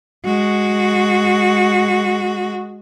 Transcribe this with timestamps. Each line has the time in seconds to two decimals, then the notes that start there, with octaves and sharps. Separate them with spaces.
0.25 G#3 F#4